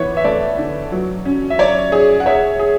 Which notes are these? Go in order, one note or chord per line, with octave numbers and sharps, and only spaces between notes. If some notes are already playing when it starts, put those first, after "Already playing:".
Already playing: E3 B3 B4 C#5
E5
A3 D5
D3
F#3
C#4
E5
C#5 D5
G#4
F#5
C#5 E5
G#4